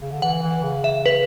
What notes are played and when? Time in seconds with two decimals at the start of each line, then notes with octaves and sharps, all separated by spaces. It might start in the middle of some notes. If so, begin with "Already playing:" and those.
0.02 C#3
0.12 D3
0.22 E3 F#5
0.43 E3
0.63 C#3
0.84 E5
1.06 B4